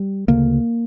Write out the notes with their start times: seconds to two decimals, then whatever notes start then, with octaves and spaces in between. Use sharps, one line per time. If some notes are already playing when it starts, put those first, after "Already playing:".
Already playing: G3
0.28 D2 C#3 A#3